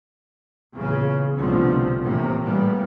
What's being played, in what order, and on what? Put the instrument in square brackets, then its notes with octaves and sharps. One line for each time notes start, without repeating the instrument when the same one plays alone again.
[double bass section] E2 A#2 C#3
F1 C2 B2 D3 F3 C4
A2 C3 E3 A#3
A2 E3 G3 A#3 B3